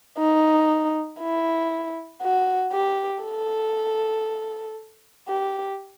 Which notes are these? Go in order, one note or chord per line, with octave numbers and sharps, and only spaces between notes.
D#4
E4
F#4
G4
A4
G4